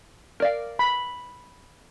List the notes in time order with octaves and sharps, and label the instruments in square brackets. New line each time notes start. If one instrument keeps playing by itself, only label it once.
[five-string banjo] A#4 D5 F5
[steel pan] B5